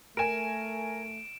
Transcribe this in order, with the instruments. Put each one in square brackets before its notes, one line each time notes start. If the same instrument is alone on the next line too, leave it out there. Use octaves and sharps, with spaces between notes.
[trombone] A3 [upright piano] A#4 G#5 [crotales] D7 E7